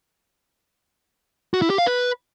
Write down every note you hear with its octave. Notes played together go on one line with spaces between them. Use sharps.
F#4
E4
G4
F5
B4